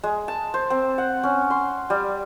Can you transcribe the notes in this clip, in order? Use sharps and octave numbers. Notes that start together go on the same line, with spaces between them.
G#3
A5
C5
C4
F#5
C#4
C6
G3